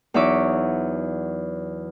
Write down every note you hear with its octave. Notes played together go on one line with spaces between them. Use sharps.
E2 F#3 D#4 E5 C#6 D6